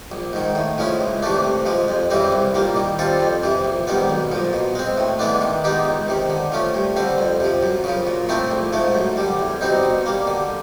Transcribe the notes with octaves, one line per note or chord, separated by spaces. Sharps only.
A#1
G#2 D#3
A2
F3 G#3 C#4 E4
C#2
C3 E3 A3 D4
C3
F3 G#3
F2
C#3 E3 G3 C4
C2
A#2 G3 A#3
D#3
G3 C4 F4 A4
F2
C3 E3
A#1
G#2 D#3 G3 B3
B1
A#2 F3
B2
G#3 C4
A2
E3 G#3 B3 D4
D#3
G#3 B3 D#4 G4
C#2
C3 D#3
D3
F3 A3 C#4
G2
D3 G3 C4
F2
C3 F3
F#2
C#3 F3
A#2
F3 A3 C4 E4
A#1
G#2 F3 A3
F#2
D3 G3
E2
B2 G3 C4 D#4
B2
G3 A#3
D3